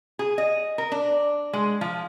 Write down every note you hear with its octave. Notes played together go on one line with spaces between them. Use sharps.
G#4
D#5
A#4
D4
G#3
F3